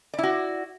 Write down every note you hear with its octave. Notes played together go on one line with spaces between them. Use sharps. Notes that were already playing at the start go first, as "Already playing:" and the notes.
E4 F#4 D5